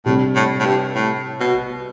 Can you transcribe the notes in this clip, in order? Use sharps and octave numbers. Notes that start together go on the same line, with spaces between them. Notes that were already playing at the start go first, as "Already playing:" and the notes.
A2 C3 G3 D4
A2
A2
G2
A2
B2